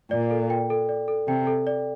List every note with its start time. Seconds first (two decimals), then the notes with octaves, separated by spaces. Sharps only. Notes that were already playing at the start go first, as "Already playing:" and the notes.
0.11 A#2 D5
0.31 A4
0.50 G5
0.70 A4
0.89 D5
1.08 A4
1.28 C3 G5
1.47 A4
1.67 D5